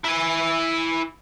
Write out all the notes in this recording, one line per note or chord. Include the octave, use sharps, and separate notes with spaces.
E4 G#5